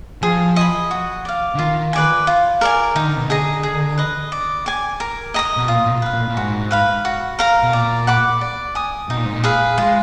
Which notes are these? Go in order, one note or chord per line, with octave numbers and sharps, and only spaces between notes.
F3 G#4
D#5 G#5 B5
F#4
D5 F5
D3
D#3 F4
B4 D5 G#5
F4
A#4 D5 G#5
D#3 D#4
D3
B2
D3 G#4 D#5 A#5
G#4
B4 D#5
D5
G#5 D6
A#4
D#5 A#5 D#6
B2
A#2 F4
A#2
B2
B4 F5
A#2
A#2
G#2 F#4
B4 F5 B5
F#4
A#4 F5 A#5
B2
A#2 D5
F#5 B5 D6
D5
G#5 D#6
B2 D#4
A#2
G#2
A#2
G#4 B4 F5
G#3 F4